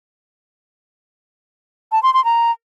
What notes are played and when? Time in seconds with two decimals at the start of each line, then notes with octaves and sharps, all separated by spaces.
1.92 A5
2.03 C6
2.14 C6
2.25 A#5